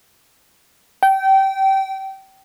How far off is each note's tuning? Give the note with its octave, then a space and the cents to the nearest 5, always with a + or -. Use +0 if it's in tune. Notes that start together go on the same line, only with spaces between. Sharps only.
G5 -25